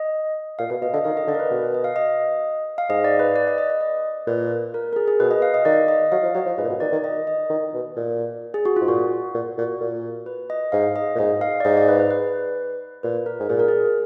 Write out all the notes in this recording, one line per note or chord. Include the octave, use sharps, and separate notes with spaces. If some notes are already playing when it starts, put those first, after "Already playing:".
Already playing: D#5
A#2 F5
B2 F5
B2 D#5
D3 D#5
D#3 F5
D#5
D3 D5
A#4
B4
B2
D#5
F5
D#5
F5
G#2 D#5
D5
B4
D5
D#5
D#5
D#5
D5
A#2 B4
A#4
A#4
G#4
G#4
B2 B4
D#5
F5
D#5
D#3 D5
D#5
F#3 F5
F3
F#3 D#5
F3
G#2 B4
A#2
B2
D#3 D5
D#3
D#5
D#5
D#3
B2
A#2
G#4
F#4
F4
G#2
A#2 F#4
A#2
A#2
A#2
B4
D#5
G#2 F5
D#5
A#2
G#2 D#5
F5
D5
G#2 D#5
D5
B4
B4
B4
A#2 B4
A#4
G#2
A#2 G#4
A#4
G#4